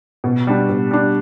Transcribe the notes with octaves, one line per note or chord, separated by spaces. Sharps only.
B2
G3 D4
B2
G3 D4